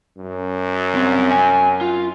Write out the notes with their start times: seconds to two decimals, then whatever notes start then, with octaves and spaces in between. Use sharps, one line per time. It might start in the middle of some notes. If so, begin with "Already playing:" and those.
0.17 F#2
0.94 C2 C4
1.31 G#5
1.81 F4